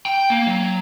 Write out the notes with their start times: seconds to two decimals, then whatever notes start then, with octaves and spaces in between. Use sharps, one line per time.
0.06 G5
0.30 A#3
0.47 F#3